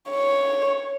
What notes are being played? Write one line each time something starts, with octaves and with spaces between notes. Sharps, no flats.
C#5